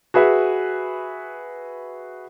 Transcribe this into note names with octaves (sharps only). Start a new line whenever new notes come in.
F#4 G#4 B4 E5